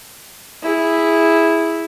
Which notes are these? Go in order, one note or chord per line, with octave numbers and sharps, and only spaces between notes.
E4 G#4